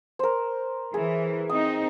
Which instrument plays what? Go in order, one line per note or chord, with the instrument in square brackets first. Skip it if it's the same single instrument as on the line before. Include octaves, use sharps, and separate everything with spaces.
[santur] A#4 C5
[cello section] E3 [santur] G#4
[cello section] C4 D#4 [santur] D#6